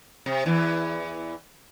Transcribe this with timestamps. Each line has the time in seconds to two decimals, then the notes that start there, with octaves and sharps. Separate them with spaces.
0.26 C3
0.46 E2 E3